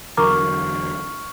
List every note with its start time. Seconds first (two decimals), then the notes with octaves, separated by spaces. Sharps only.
0.17 E2 D3 F#3 A#4 A#5 C#6 D6 F6